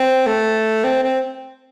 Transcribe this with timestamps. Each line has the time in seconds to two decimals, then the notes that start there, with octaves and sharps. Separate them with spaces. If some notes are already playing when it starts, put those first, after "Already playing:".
Already playing: C4
0.27 A3
0.84 C4
1.03 C4